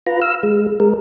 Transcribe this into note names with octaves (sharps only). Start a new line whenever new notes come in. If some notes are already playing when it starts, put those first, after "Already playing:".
F4 B4 A#5
F5 E6
G#3
G#3 A#4